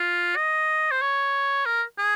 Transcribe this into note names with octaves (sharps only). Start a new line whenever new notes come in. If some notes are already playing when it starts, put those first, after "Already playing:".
Already playing: F4
D#5
C5
C#5
A#4
G#4